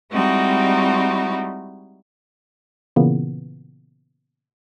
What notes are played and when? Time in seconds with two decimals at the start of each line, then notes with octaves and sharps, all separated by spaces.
0.12 G3 G#3 C4 D#4 E4 F#4
2.96 A#2 C#3 E3 A#3 B3